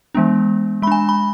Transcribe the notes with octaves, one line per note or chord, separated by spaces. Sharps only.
E3 G#3 B3 D4
G#3 D4 G#5 B5
B5